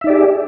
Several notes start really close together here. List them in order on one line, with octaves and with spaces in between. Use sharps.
E5 D#4 D5 G4 G#4